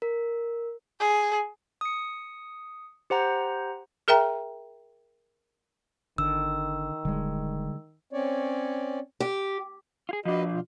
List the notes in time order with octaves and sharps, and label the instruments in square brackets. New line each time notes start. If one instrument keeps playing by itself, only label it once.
[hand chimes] A#4
[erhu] G#4
[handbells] D#6 C#7
G4 C5 F#5 A#5
[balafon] G#4 A#4 E5 G5 A#5
[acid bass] G1 [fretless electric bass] D3 [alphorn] D#3 [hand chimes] E6
[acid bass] D#1 [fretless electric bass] D3 G3 G#3
[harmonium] C4 C#4 C#5 D5
[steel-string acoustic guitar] G4
[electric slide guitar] F4 G#4
[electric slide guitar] F3 D4 [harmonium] F#4 B4 D#5
[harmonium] B2 F4